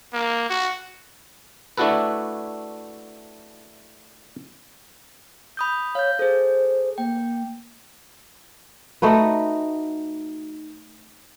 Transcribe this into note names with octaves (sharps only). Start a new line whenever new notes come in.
A#3
F#4
A3 D4 E4 F#4 A4 B4
B5 D#6 G6
C#5 F5 G6
G#4 A4 C5
A#3 G5
A3 D#4 F#4 B4